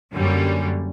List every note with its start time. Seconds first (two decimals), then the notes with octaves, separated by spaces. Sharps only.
0.13 F#2 D3 G3 A#3 C#4